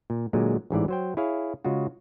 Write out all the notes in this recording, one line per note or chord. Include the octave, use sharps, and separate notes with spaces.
A#2
A#2 D3 F#3 G#3
A1 G#2 E3 D5
F#3 C5 G5
E4 G#4 C#5 F5
C#3 G#3 F4 F#4